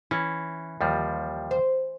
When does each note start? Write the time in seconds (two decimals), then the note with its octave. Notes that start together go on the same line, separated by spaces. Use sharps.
0.11 E3 C#4
0.81 D#2 F3 G3
1.51 C5